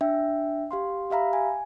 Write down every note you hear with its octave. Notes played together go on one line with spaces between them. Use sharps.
D4 E5 G5
G4 F5 C6
G4 E5 F5 A#5 B5
G#5